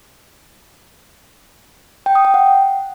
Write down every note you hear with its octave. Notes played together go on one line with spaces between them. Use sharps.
G5
D#6
G5
F#5